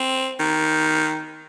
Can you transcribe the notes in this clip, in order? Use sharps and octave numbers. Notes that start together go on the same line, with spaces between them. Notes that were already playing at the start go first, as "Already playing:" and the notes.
Already playing: C4
D#3